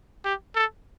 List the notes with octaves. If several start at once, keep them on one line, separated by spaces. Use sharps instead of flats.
G4
A4